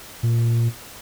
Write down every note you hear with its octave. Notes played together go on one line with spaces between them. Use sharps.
A#2